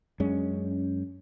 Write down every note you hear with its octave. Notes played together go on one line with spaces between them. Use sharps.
F#2 G#3 C#4 D4